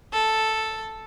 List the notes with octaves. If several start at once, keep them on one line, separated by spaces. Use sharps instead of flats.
A4